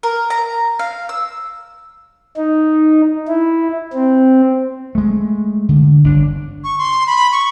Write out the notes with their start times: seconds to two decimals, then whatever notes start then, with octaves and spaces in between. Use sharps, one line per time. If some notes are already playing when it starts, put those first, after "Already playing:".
0.03 A#4
0.30 A#5
0.79 F5
1.09 E6
2.37 D#4
3.28 E4
3.93 C4
4.95 G#3 A3
5.69 D3
6.04 G1 D4
6.64 C#6
6.78 C6
7.07 B5
7.32 C#6